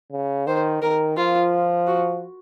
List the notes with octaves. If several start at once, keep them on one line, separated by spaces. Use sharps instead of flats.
C#3
D#3 C5
D#3 A#4
F3 F4
F#4